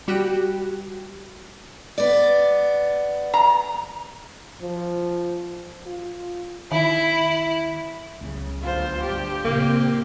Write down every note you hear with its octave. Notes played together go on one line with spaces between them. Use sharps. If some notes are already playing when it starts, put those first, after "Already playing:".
G3 F#4 G4 G5 F#6
B3 D5
A#5
F3
F4
D#3 E4
C#2 C#3 F#3
G1 D2 F4 C5
D2 G2 G4
A#2 C#3 A#3 C4